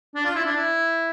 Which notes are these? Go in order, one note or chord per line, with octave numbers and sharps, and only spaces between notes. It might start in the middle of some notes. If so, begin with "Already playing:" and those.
D4
F4
E4
D4
E4